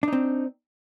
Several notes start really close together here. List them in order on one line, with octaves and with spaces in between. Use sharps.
D4 D#4 C4